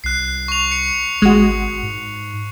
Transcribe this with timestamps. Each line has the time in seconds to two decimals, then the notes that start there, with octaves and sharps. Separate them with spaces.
0.04 C2 F#6 C7
0.48 C#6 F7
0.72 C#7
1.22 G#1 G#3 F#4
1.83 G#2